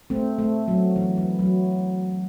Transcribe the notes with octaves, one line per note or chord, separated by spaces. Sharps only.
A3 C4
A3
F#3
E3
E3
F#3